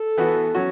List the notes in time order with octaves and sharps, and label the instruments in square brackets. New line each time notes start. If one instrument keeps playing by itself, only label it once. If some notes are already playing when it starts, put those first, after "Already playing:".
Already playing: [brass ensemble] A4
[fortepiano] E3 B3 F#4
F#3 C#4 F#4